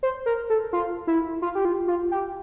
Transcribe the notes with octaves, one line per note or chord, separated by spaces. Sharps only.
C5
A#4
A4
F4
E4
F4
G4
F4
F4
G4